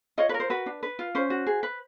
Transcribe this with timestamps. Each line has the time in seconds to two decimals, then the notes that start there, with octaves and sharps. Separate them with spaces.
0.18 F4 C#5 D#5
0.29 B4 C#5
0.34 A#4
0.40 C5
0.50 F#4 B4
0.66 D4
0.83 B4
0.99 F4
1.15 C#4 C5
1.30 F#4
1.47 G#4
1.63 B4